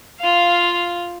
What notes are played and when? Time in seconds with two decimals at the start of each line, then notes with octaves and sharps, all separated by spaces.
0.20 F4 F5